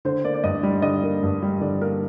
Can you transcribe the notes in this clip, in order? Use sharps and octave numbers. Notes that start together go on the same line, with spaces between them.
D3 C5
A#3 D5
D5
G2 D#5
G3 D5
D3 D#5
A#3
G2
G3
D3 D5
A#3 A#4